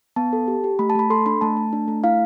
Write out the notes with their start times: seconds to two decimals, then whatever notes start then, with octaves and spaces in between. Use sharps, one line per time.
0.16 B3 A5
0.33 A4
0.48 G4
0.64 G4
0.79 A3 B5
0.90 A5
0.95 A3 B5
1.10 A4 C6
1.26 D4 B5
1.41 A3 A5
1.57 A3
1.73 D4
1.88 A3
2.04 E4 F5